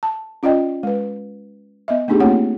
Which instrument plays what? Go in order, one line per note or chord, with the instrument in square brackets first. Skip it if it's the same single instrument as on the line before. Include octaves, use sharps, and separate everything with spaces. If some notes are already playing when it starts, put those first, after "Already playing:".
[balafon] A5
C#4 F4 D5 D#5 G5
G#3 B4
B3 D#5 E5
A3 B3 D4 D#4 G4 G#4
A3 A#3 C4 F4 C#5 F#5